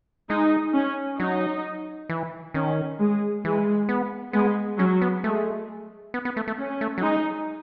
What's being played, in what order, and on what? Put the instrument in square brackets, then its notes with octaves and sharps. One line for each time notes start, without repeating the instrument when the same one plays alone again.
[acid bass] G#3 [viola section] D#4
[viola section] C#4
[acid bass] F#3 [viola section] D#4
[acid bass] E3
[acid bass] D#3 [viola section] C#4
[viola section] G#3
[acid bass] E3 [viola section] G#3
[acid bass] B3
[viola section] G#3 [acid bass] B3
[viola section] F#3 [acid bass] C#4
[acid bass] B3
[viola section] G#3 [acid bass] A3
[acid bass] B3
B3
A3
A3
[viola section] C#4
[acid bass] A3
F#3
[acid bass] G#3 [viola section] D#4